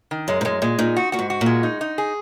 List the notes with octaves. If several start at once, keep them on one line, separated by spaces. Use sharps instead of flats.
D#3
F#2 G#3
G#2
F#2 G#3
A#2 G#3
A#2 D#4
F#4
A#2 F#4
G#2
F#4
A#2
G#3
D#4
D#4
G#4